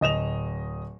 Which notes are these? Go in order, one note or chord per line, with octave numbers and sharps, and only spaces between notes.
D1 D#5 E7 F7